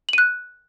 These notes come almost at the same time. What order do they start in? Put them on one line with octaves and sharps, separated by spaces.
F#7 D#7 F#6